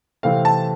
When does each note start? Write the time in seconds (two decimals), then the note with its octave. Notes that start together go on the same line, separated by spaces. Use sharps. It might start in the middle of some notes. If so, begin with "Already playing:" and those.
0.23 C3 E3 A3 C4 F5
0.45 A5